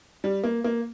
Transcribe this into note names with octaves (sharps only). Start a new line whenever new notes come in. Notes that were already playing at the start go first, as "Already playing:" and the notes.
G3
A#3
A#3